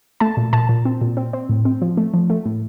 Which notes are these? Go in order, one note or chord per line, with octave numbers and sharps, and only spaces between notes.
A3 A5
A#2
A#2 A5
A#2
C4
A#2
C4
C4
A2
C4
F3
A3
F3
A3
A2